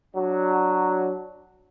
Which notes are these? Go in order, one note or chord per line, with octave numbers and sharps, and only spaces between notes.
F#3 D4